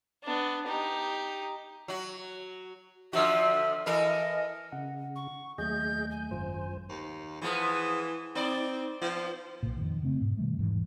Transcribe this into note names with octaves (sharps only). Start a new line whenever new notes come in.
B3 D4
D#4 G4
F#3 F#4
D3 F3 F#4 E5
E3 A4 A#4 D#5
C#3 F#5
C#6
D#2 F#3 A3 G#4 D#5 G6
G#5 G6
G#1 F#2 G#3 F4 C5
D#2
E3 F3 G#3 B3
C4 D#4 D5
F3 B3
B1 A#2
F2 D#3
C#3 A3 C4
G#2 B2
B2 D#3 G3 A3
E1 G#2 E3